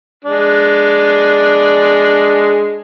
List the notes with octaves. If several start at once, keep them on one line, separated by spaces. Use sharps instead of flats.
G#3 D4